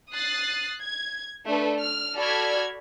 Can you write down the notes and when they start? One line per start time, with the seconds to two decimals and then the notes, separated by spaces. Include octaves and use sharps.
0.13 D#6 F#6 A6 C7
0.82 G#6
1.45 A3 D4 A4 B4
1.80 F6
2.16 F#4 A4 D5 B5 F6 G#6